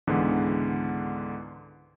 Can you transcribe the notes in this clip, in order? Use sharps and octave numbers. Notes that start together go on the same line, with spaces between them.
C#2 G#2 D3 E3 B3